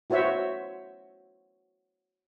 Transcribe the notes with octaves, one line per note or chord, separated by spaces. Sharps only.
E4 F#4 C5 C#5 E5